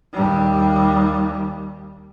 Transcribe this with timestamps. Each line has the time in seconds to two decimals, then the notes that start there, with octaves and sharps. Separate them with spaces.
0.14 D#2 G3